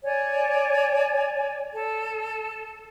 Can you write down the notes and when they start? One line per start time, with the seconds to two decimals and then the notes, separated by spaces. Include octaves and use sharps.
0.04 C#5 D5 G#5
1.73 A4